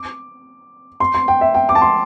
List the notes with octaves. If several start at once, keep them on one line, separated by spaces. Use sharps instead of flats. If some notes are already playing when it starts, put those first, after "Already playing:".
Already playing: D6
C6
C6
G5
E5
G5
D6
A5
C6